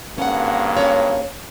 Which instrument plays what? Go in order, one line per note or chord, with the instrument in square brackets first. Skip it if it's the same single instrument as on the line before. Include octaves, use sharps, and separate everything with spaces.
[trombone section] G#1 G2 A#3 [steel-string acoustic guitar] C#4 F#5
[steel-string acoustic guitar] C#4 C#5